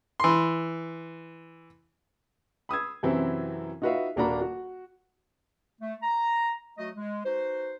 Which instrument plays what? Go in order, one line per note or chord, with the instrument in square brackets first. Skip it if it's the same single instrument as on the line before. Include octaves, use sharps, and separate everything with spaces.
[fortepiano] E3 C6
[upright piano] B5 D#6 E6 G#6
F#2 C3 E3 F#3 C4 E4
D#4 F4 F#4 B4 E5 F5
D#1 A#3 D4 F#4 A#5 B5
F#4
[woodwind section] A3
A#5
F#3 A3 F#4 D#5
G#3
D#4 F#4 B4 C5